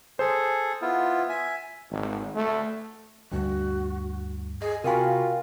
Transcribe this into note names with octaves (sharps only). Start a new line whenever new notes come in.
G#4 A4 C5
B3 E4 F4
E5 G#5
G#1
A3
D2 G2 F#4
G#4 D#5
C3 F4 F#4 A#4 F5 G5 G#5 B5